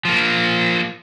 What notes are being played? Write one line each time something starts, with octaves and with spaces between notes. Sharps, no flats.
F3 A#3